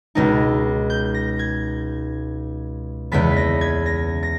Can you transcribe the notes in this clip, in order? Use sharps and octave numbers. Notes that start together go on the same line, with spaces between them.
C#2 B2 G#3 D#4 A#6
G6
A#6
G#6
E2 C#3 E3 G#3 B3 B6
A#6
G#6
A#6
A#6